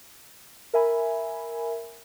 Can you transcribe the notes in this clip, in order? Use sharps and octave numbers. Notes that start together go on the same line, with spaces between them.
A#4 E5 G#5 B5